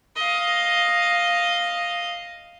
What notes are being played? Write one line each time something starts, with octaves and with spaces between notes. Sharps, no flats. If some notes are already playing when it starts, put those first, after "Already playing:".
D#5 F5